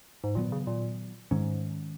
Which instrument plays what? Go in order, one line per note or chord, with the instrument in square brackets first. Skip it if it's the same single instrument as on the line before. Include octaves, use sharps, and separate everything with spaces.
[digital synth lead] G#2
[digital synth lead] A#2 [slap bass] D#3 F#3 B3
[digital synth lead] C#3
A#2
[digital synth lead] G#2 [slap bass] D#3 G#3 C#4